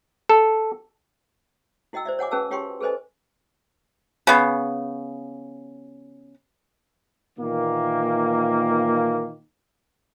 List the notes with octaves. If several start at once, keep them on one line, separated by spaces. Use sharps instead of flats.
A4
E4 F#4 D#5 G5 E6
C5 D5 E5
C#5 F#5 G#5 D6
C#4 F#4 G#4 B4 A5 E6
F4 G4 C#5 G5 C6 C#6
G#4 A4 B4 C5 D#5 G#5
C#3 B3
A#2 D#3 E3 A#3